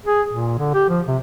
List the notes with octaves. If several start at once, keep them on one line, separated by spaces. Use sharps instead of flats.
G#4
A#2
D3
G4
F3
C3